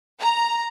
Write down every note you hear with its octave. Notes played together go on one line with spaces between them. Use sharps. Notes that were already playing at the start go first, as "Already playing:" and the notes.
A#5